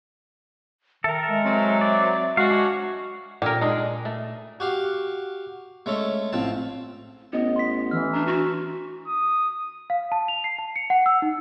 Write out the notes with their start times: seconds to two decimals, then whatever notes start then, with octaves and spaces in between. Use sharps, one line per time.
1.04 D#3 A4 A#4 E5
1.29 G#3
1.45 F#3 C4
1.81 D5
2.37 G#3 F#4 F5
2.51 D4 C#5
3.42 A#2 G4 A#4 G5
3.61 G#3 D4 D#4
4.05 A3
4.60 F#4 G4 F5
5.86 G#3 A3 C#4 A4
6.33 A1 F3 C4 A5
7.33 A1 B3 D#5
7.56 C6 B6
7.91 E3 E6 F6
8.13 D4 A#5
8.27 F#4 A#5
9.08 D#6
9.90 F5
10.12 A5
10.28 F7
10.44 C7
10.59 A5
10.76 C#7
10.90 F#5
11.06 E6
11.22 D#4